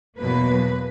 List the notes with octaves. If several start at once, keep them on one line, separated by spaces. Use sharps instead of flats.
E2 B2 F#3 A#3 B4